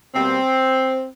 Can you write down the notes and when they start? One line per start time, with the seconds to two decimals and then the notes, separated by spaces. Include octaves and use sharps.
0.15 B2 G3 A#3 C4